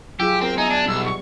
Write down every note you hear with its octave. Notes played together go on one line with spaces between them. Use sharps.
F#3 F4 G4 G#4 E6
C4 A#4
B3 D#4 E5 G#5
D4
B1 G3 E6
C#6